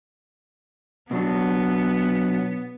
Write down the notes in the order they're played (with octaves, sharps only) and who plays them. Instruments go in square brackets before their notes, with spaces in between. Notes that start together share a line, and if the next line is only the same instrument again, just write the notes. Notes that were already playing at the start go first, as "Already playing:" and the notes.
[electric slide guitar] B2 F#3 D4 [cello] B3